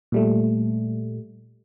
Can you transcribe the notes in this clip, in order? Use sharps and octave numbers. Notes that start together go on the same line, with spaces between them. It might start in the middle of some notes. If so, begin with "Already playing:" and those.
A#2 G3 A3